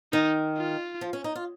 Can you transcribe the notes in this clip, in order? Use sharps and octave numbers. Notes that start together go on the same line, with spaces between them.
D#3 D#4
F4
F3
C#4
D#4
F4